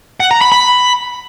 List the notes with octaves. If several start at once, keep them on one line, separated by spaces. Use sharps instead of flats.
F#5
A#5
B5
B5